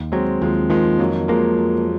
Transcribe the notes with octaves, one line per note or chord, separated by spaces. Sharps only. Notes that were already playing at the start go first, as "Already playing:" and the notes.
Already playing: D#2
F#3 G#3 C4
D#2 F3 G#3
D#3 F3 G#3
F2 F#3 A#3
F3 G#3 A#3
F2